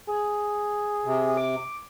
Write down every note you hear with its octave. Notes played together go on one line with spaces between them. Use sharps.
G#4
C3
D6